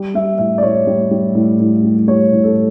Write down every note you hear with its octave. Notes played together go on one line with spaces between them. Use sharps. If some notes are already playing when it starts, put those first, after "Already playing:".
Already playing: G3
G3 E5
A2 E5
D5
A2 C#5
G3
G3
A2
A2
G3
G3 C#5
A2
A4